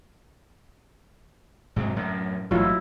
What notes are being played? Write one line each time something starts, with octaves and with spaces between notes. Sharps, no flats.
G#2 C3 F#3
F#2 A2
A1 G#2 F#3 E4 F4